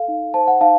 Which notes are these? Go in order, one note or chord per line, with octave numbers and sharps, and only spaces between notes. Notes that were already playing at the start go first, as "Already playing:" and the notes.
Already playing: A4 F5
D#4
C5 A5
F#5
D#4 F5 A5